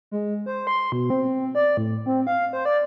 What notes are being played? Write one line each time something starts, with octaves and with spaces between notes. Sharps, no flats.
G#3
C5
C6
B2
C4
D5
A2
C4
F5
C5
D5